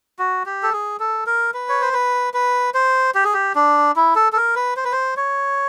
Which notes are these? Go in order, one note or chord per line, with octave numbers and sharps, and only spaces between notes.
F#4
G4
A4
G#4
A4
A#4
B4
C#5
C5
B4
B4
C5
G4
G#4
G4
D4
E4
A4
A4
A#4
B4
C5
B4
C5
C#5